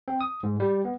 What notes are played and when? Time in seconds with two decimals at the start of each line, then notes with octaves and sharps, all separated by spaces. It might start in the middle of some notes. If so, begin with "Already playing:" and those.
0.08 C4
0.21 D#6
0.43 G#2
0.60 G3
0.85 B3